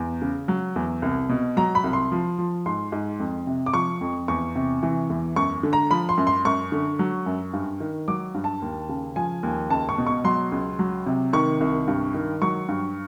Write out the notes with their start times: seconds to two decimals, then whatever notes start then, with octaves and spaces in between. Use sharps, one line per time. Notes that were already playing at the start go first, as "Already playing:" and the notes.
Already playing: E2
0.22 C#3
0.48 F#3
0.76 E2
1.02 C2
1.29 B2
1.57 F#3 A#5
1.75 B5
1.84 C2
1.93 C6
2.12 F3
2.38 F3
2.66 G#2 C6
2.92 G#2
3.20 F2
3.47 C3
3.66 D6
3.74 F3 C#6
4.01 F2
4.28 E2 C#6
4.55 C3
4.83 E3
5.10 E2
5.36 F#2 C#6
5.63 D3
5.73 A#5
5.91 F3 B5
6.09 C6
6.18 F#2
6.27 C6
6.45 F#2 C#6
6.72 D3
6.99 F#3
7.26 F#2
7.53 G2
7.80 D#3
8.08 F#3 D6
8.34 G2
8.44 A5
8.62 D#2
8.89 C#3
9.16 F3 G#5
9.43 D#2
9.70 C#2 A5
9.89 C#6
9.98 B2
10.07 C#6
10.24 F#3 C6
10.52 C#2
10.79 F#3
11.06 C3
11.33 D#3 C#6
11.60 C2
11.88 G2
12.14 D#3
12.42 F#3 C#6
12.69 G2